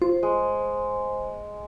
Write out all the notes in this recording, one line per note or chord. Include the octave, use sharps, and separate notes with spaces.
F4 C5
G#3